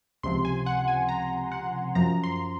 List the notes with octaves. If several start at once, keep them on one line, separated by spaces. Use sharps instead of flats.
C#2 C3 F3 C6
G#5
F#5
G#5
A#5
F#5
F#2 F3 A#5
C6